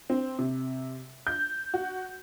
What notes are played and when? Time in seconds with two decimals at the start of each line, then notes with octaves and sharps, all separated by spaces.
0.10 C4
0.39 C3
1.27 G6
1.74 F#4